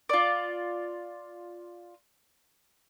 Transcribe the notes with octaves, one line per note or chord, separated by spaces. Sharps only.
F4 D5